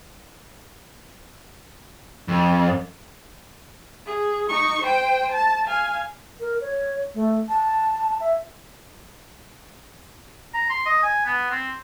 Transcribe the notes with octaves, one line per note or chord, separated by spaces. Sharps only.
F2
G#4
D#4 C#6
C5 G5
A5
F5 G#5
A#4
C#5
A3
A5
E5
A#5
C6
D#5
G#5
B3
C4